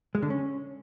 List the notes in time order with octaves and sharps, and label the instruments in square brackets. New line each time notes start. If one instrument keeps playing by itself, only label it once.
[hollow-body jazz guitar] G#3
D3
C#4